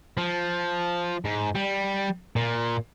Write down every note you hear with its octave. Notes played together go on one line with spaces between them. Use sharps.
F3
G#2
G3
A#2